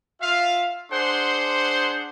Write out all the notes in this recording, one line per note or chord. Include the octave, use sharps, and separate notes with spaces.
F4 E5 F5
D4 G#4 C5 F#5 C6